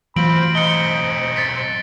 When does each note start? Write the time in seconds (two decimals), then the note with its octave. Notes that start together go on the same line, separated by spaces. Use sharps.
0.16 E3 F#3 A3 C4 F4 B5 D7 F#7
0.55 B1 C4 D#5 C#7 G7
1.36 A6 B6 C#7